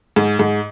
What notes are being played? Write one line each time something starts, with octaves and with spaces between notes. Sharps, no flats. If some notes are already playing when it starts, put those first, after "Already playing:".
G#2
G#2